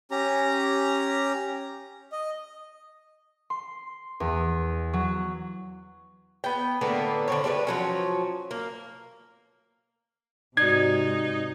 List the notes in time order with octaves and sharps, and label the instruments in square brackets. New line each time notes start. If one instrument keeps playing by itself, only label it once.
[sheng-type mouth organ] C#4 G4 A#5
D#5
[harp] C6
E2
F#3
[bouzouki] B3 G5
A2 D3 A#3 B3
D3 C4 C#5
G3 A3 G4 B4
F3 F#3 C#4
A#3
[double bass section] G#2 C3 [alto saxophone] D#4 [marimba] F#4 D5 [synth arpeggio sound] G#6